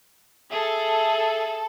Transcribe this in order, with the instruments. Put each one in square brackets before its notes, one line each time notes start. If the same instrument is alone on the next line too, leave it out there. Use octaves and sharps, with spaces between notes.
[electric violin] G#4 [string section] A4 [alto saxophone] E5